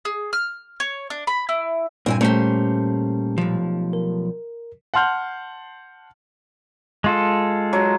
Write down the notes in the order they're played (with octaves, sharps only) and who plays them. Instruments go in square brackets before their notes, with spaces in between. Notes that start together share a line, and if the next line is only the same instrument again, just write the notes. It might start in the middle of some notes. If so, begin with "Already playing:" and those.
[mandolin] G#4
F6
C#5
D4
B5
E4
[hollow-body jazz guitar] G2 [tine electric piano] A#2 G3 [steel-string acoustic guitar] C4 E4 G#5
[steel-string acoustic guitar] A3 G4 [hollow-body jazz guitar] A#3 C#4 C5
[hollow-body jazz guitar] B1 F3
[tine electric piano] A#4
[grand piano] F#5 A5 C6 F6 G6
[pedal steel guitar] G#3 F4 A4
[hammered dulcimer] F#3